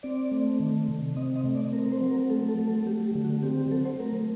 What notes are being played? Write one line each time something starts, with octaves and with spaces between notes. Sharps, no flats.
C4 D5
A3
D#3
C3
C4 D#5
D#5
A3
D5
C4 A#4
A#4
C5
F#3
A#4
A3 A4
A4
F#3
A4
A3 G4
G4
D3
F#4
C4 G4
G4
F#3 A4
C5
A3 A#4